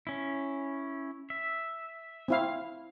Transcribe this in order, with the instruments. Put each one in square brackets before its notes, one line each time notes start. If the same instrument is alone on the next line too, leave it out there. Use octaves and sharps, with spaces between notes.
[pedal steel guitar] C#4 E4
E5
[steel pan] C4 E4 F5